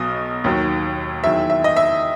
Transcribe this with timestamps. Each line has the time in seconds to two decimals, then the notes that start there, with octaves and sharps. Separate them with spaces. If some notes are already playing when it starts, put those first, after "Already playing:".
Already playing: B1 B2 F#3 D#5
0.44 D#2 D#3 F#3
1.24 E2 D#3 F#3 E5
1.50 E5
1.64 D#5
1.77 E5